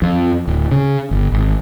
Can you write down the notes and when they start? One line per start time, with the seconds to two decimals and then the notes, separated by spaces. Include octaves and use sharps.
0.02 F2
0.47 D1
0.72 C#3
1.11 G1
1.32 G#1